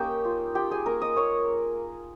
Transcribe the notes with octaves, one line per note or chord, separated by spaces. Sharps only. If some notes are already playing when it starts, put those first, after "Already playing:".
Already playing: A#3 C#4 D#4 G4 A#4 C#5 G5
F4
F4 G4 G5
G#4 G#5
A#3 A#4 A#5
D#5 D#6
A#3 C#5 C#6